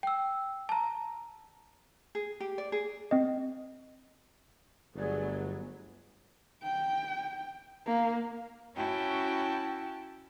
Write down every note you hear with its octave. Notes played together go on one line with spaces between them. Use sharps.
G5 E6
A5 A#5
G#4
G4
D5
G#4
C4 D#5
G1 F#3 A3 B3 G#4 D5
G5
A#3
C#4 E4 F#4 G5 A5